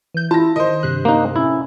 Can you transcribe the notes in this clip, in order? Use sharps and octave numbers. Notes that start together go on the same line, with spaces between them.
E3 G6
E4 F4 A5 A#6
D#3 C5 D#5
G2 C3 F#6
A#3 D#4
A2 C#4 E4